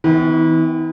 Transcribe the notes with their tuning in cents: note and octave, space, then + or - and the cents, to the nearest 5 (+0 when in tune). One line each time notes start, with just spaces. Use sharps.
E3 -40 B3 +30 E5 +0